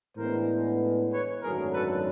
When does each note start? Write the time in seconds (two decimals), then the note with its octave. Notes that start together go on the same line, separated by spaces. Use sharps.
0.17 A2 E3 G#3 B3 D4 A#4 C5
1.11 B4 C#5
1.42 G#1 F#2 D3 F#3 A3 G#4 A#4
1.74 A4 B4